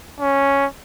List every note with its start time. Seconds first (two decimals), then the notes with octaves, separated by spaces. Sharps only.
0.20 C#4